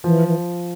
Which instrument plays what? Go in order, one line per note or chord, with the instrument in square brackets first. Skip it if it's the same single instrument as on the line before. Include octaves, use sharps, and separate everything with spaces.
[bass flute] E3 [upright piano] F3
[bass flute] E3